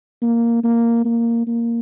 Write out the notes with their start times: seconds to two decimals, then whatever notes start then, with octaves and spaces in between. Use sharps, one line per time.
0.22 A#3
0.64 A#3
1.05 A#3
1.47 A#3